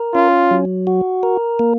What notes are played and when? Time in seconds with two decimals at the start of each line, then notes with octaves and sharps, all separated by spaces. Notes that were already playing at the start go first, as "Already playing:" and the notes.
Already playing: A#4
0.14 C#4 F4
0.51 F#3
0.87 F#4
1.23 A#4
1.59 A#3